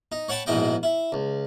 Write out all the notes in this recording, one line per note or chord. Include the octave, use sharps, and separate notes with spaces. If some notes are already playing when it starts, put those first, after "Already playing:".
D#4
C#5 F#5 G5 A5 B5
A#1 G#2 B2 E4 D#5 G5
E4
C#2